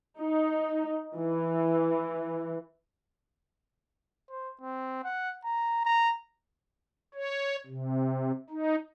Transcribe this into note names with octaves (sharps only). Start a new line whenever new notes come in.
D#4
E3
C5
C4
F#5
A#5
A#5
C#5
C3
D#4